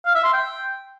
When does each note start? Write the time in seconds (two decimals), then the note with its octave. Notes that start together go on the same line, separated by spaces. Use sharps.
0.06 F5
0.15 E5
0.24 C6
0.33 G5